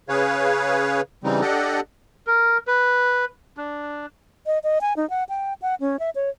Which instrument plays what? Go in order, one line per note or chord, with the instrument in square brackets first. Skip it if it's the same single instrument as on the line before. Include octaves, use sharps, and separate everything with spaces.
[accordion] C#3 G#4 B4 C#5 F5
C#3 E3 G3 C4 D#4
D4 G4 A4 D5 D#5 F#5
[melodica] A#4
B4
D4
[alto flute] D#5
D#5
G#5
D#4
F#5
G5
F#5
C#4
E5
C#5